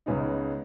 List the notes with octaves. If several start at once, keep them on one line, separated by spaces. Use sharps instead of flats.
C#2 C#3 G#3 B3 D#4